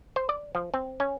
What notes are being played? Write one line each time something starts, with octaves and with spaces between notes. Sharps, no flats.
C5
D5
F3
C4
C#4